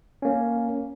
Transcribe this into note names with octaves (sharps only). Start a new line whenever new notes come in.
A#3 C#4